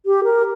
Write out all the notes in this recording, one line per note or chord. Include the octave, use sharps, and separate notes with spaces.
G4
A#4